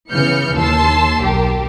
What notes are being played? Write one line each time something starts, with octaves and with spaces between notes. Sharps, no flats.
C#3 E3 B3 F6 G6 C#7
D#2 A5 C6 E6 C7
B1 G4 A#4